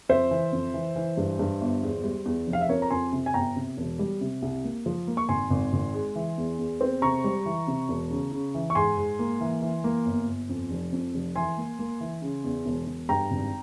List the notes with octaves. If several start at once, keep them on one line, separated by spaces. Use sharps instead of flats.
F2 C5 E5
E3
F2
E3
E3
G2
G2
G1
E2
G3
E2
F1
F5
E5
F2 A#4 C#5
A#5
F2 G#5 C6
C3
G#5
G1 G5 A#5
C3
E1
G3
C3
C2
A#3
F3
A#3
C#6
G#1 G#5 C6
G#1
G#1
G#3
E3
E2
E2
C4
C3 A#5 C#6
G3
E3
C3
E1
C#3
C#3
E3
C#6
G#2 G#5 C6
G#2
A#3
E3
E3
A#3
G1
G1
F2
F1
F2
F1
E3 G#5 C6
A#3
A#3
E3
C#3
E2
E1
E1
G2 G5 A#5
G#1